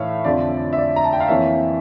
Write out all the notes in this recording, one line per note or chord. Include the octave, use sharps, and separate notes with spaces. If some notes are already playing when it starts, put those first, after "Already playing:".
Already playing: A2 E3 A3 C#5 E5 F5
F2 D3 F3 D5
E5
D5
A#5
A5
G5
F5
F2 E3 A#3 C#5 E5